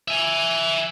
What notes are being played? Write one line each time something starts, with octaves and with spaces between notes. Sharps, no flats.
E5 G#5